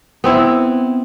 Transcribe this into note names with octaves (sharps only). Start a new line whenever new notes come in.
B3 C4 E4